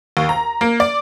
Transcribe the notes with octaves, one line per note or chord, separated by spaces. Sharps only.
D#2
A#5
A#3
D5